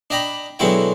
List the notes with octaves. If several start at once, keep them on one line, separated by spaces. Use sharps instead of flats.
D4 D#5 G5 A#5 B5
B2 D3 F#3 G#3 E4 G5